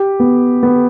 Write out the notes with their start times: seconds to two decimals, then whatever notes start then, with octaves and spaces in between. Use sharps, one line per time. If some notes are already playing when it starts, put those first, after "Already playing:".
Already playing: G4
0.20 B3
0.63 B3